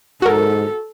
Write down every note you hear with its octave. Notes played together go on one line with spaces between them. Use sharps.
G#2 F#4 A4 A#4